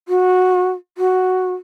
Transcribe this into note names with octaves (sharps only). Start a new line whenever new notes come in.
F#4
F#4